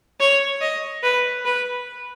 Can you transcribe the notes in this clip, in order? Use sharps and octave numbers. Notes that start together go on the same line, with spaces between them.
C#5
D#5
B4
B4